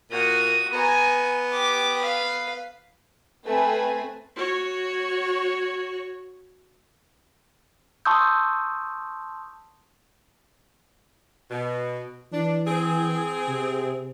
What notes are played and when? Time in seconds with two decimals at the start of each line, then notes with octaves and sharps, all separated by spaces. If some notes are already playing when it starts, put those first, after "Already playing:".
0.11 A#2 F#4 D#6
0.73 B3 G#5 A#5
1.52 G4 D6
1.98 B4 F5
3.46 A3 C4 B4 G#5
4.36 F#4 C#5
8.05 A5 C6 C#6 D#6 E6 G6
11.51 B2
12.32 E3 D4
12.67 C4 G#4
13.48 C3